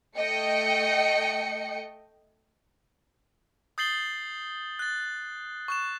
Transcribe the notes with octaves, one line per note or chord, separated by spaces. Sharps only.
A3 D#5 G5 C#7
D#6 G6 A6 C7 F#7 G7
F#6 A6
C#6 F#6 E7